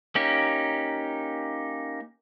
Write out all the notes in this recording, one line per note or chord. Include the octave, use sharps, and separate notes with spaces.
A#3 C#4 D#4 G4